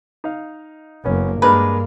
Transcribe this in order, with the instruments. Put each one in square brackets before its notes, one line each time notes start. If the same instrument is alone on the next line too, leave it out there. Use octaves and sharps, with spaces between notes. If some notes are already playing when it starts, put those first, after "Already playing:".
[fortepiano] D#4 F5
[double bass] F#1 A#3 [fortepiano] B3 C#4
[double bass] G2 A#3 [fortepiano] G#3 D4 A#4 [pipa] B4